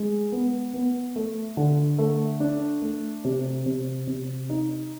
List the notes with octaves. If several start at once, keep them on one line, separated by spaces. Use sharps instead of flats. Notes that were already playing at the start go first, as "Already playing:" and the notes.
Already playing: G#3
B3
B3
A3
D3
A3
D4
A3
C3
C3
C3
D#4